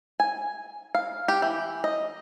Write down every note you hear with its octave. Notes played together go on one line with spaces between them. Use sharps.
G#5
F5
G4
E3
D#5